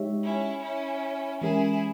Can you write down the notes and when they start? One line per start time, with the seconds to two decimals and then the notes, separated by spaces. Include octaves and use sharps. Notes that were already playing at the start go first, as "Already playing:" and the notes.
Already playing: G#3 D#4 G4 C#5 E5
0.24 C#4 E4
0.63 C#4 E4
1.41 E3 G#3 C#4 E4 G4 G#4 A#4